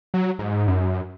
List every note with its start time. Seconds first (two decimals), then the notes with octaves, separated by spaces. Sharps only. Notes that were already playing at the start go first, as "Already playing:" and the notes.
0.14 F#3
0.39 G#2
0.68 F#2